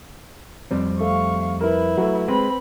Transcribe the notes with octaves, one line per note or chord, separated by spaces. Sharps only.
F2 G3 C4
A3 F5 C#6
E4 A#4 B4
F#3 A3
G#3 C4 B4 B5